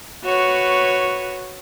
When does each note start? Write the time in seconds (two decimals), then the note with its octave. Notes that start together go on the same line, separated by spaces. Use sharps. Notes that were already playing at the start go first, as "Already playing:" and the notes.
0.25 F#4 B4 C#5